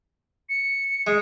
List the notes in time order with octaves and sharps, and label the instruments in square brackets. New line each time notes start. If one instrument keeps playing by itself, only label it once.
[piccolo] C#7
[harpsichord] G#3